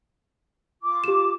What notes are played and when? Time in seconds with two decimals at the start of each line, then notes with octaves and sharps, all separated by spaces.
0.82 F4 D6
1.04 G4 E7